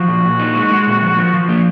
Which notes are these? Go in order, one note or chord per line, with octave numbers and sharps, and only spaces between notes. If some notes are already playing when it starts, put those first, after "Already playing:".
Already playing: F3 F#4
A#2
A#2
D#4
G#3
G#3
A#2
F3
F3
F3
A#3